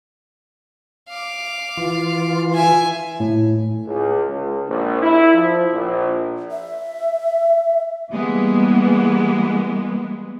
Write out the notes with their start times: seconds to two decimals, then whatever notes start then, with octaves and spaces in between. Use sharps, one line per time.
1.09 F5 D6
1.77 E3 F4
2.53 E5 G#5
3.20 A2
3.85 C#2
4.27 C#2
4.67 A#1
5.01 E4
5.32 F3
5.72 A#1
6.51 E5
8.10 E3 G3 G#3 A#3 B3